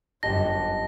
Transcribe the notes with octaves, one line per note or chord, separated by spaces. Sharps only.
G1 F#2 G4 D#5 A5 A#6